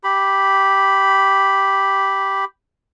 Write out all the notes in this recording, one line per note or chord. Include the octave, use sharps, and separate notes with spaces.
G4 B5